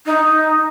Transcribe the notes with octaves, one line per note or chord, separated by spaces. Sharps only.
D#4